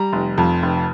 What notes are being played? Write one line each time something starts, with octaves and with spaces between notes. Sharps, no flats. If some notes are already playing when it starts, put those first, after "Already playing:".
Already playing: G3 A#5
F1
F2
F1